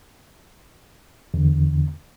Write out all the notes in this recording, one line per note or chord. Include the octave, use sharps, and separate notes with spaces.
E2 D3